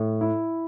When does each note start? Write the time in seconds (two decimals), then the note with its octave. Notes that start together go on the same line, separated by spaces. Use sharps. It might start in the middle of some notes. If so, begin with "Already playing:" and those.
Already playing: A2
0.21 E4